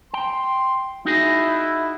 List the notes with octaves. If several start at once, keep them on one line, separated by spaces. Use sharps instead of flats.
G5 C6
D#4 E4 F#4 G#4